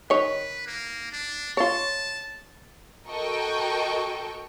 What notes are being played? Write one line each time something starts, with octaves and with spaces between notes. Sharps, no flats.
D#3 B4 C#5
A#3
D4
F4 C#5 A5
F#4 A4 A#4 D#5 G5 C#6